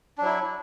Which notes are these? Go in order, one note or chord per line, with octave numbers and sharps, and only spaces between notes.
F#3 D4 E4